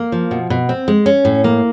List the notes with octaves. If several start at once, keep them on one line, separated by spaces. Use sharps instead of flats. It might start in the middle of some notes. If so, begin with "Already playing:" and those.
Already playing: A#3
F3
B2
B2
C4
G#3
C#4
A2
A#3